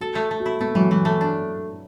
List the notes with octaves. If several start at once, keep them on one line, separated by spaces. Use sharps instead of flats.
F#4 A4
A3
A3
F#4
E4
A3 B3
E3 F#3
E3 F#3
A3
D4